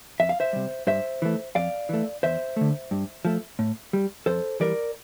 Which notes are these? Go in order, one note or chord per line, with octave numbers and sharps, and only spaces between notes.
F2 E5
F5
C5 E5
C3 G3
G2 C5 E5
E3 A3
F2 D5 F5
E3 A3
E2 C5 E5
D3 A3
G2
F3 A3
A2
G3
F2 A4 C5
E3 G3 A#4 D5